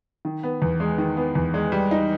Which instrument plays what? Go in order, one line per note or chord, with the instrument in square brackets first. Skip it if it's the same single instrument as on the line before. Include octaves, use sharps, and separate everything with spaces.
[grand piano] D#3
B3
E2
G#3
D#3
B3
E2
G#3
G3
D#4